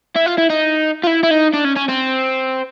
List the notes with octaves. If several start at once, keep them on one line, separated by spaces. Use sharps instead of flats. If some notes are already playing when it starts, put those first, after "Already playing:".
E4
F4
E4
D#4
F4
E4
E4
D#4
D4
C#4
C#4
C4